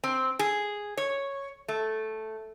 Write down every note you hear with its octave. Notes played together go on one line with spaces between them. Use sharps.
C4
G#4
C#5
A3